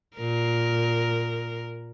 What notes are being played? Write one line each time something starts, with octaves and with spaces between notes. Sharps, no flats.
A#2 A#4